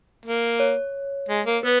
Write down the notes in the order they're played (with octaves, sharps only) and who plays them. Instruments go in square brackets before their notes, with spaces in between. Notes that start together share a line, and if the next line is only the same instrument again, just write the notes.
[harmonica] A#3
[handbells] C#5
[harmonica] G#3
A#3
[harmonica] B3 [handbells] B4